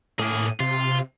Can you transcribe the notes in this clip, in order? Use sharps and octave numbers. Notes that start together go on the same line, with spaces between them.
A2 A#3 G#4
C3 F4